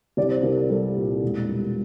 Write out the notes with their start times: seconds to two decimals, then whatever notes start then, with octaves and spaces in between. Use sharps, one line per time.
0.17 C2 D5
0.31 C5
0.43 C2 A#4
0.57 A#4
0.69 G3 A4
0.96 A#2
1.23 E1
1.49 G3